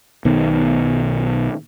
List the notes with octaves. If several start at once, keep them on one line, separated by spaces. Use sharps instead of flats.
B1 B2 D#3